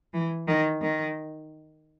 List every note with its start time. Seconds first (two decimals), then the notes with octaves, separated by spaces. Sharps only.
0.13 E3
0.48 D#3
0.81 D#3